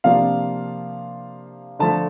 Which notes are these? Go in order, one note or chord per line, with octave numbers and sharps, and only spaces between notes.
C3 F3 A#3 D4 F4 F5
D3 F3 A3 A5